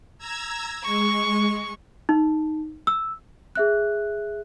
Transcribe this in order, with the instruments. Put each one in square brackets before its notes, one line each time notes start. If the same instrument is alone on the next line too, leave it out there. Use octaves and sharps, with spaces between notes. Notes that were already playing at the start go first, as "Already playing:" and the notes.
[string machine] A#5 E6 G#6
[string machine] G#3 [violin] C#6
[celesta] D#4
E6
G#4 E5 F#6